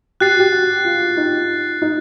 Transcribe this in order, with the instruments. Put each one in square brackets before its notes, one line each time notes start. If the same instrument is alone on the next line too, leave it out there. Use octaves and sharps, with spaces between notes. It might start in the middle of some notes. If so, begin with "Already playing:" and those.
[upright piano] G4 [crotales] F#6 A6 C7
[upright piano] F#4
G4
F#4
F4
D#4
D#4